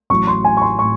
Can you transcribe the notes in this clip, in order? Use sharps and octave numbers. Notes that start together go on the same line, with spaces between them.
A1 A2 F#3 C#6
C6
G#5
C#6
C6
A2 C#6